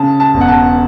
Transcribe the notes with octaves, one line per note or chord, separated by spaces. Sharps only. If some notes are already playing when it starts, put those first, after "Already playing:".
Already playing: C#3 A5
A5
E1
F#5
A5